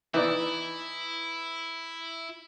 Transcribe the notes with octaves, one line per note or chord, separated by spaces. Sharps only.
E3 D#4 E4 D5